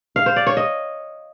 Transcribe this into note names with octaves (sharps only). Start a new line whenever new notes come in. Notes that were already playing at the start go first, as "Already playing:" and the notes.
F5
C5
D5
C#5
D#5